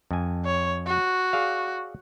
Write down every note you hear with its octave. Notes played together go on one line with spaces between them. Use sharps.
F2 G#5
C#5
F#4
G#4 D5 F5